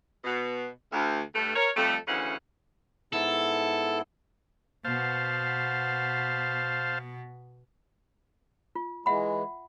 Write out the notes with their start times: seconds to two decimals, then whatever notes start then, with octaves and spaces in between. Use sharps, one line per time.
0.24 B2
0.92 D2
1.35 G2 A3
1.54 A#4 C#5
1.75 F2 G3 A3
2.06 D2 C#3 E3 C#4 F#5
3.13 G#2 B3 E4 A4
4.85 B2 B3 C5 F5 A5
8.75 F4
9.06 E3 G#3 E5 F#5 B5